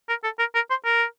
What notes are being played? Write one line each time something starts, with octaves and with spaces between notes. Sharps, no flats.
A#4
A4
A#4
A#4
C5
A#4